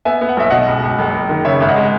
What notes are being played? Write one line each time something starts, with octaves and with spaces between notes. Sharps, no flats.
B3 E5 G#5
B3
F#5
B1 E5
B2 D#5 F#5
C#2
C#2
F#1
F#1
D#3
C#3 C#5 E5
G#1 E5
D#5 F#5
G#3